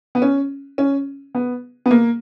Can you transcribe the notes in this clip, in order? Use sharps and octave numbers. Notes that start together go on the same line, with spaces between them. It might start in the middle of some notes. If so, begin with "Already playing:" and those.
B3
C#4
C#4
B3
B3
A#3